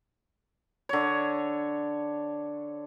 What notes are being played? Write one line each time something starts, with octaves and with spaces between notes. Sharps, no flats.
D3 C#5